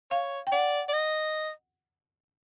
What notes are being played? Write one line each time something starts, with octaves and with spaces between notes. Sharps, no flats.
C#5 F5
G5
D5 F#5
D5
D#5